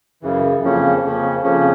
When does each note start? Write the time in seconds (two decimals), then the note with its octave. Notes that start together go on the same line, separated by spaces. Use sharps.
0.22 F#2 C#3 E3
0.62 F2 C#3 F3 A#3 C#4
1.03 F2 C#3 F3 A#3 C#4
1.43 F2 C#3 F3 A#3 C#4